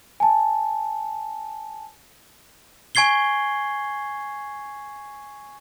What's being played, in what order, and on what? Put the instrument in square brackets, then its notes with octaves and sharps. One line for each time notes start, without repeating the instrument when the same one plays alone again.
[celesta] G#5 A5
[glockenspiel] G#5 C#6 G#6 C7 G7